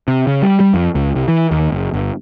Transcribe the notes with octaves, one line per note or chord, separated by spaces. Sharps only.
C3
C#3
G3
G3
F2
C#2
C2
E3
D#2
F#1
G1